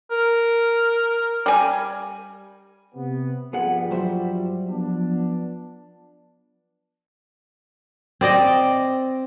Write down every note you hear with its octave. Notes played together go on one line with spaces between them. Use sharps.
A#4
G3 G#5
C3 B3
G2 F3 G3 B3 G#4 F#5
F#3 C5 E5
F3 B3 D4
C4 D5 D#5